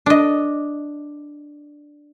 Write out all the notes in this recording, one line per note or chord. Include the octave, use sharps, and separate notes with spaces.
D4 D#5